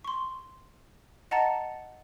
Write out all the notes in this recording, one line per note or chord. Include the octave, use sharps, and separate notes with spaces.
C6 C#6
D#5 F#5 A5 A#5 A6 C#7